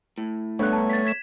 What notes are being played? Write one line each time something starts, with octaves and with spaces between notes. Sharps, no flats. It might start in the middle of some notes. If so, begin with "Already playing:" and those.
A2
G2 A3 B3 D4 A4 C#5 F#6
A5 A#5
A6 B6
G#6 B6 E7